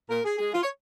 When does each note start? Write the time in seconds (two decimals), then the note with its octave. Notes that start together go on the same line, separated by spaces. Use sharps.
0.09 A#2 A#4
0.25 G#4
0.38 G#3 G#4
0.54 F4
0.63 C#5